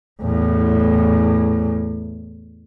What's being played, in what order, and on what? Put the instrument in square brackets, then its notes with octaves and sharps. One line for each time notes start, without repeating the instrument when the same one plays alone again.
[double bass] E2 A2